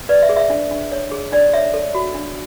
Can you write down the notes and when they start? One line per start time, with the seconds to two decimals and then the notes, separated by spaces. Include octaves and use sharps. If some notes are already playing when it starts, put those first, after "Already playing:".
0.09 B4 D5
0.22 E5
0.29 G#4
0.36 E5
0.50 D4
0.71 D4
0.92 C#5
1.11 G#4
1.32 D4 D5
1.53 C#5 E5
1.74 A4
1.94 F#4
2.15 D4